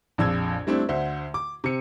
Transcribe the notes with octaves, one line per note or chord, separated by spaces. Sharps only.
A#1 F2 E6 G#6
G3 A3 C4 D4 E4
D2 C5 E5 F#5
D6
C3 C#7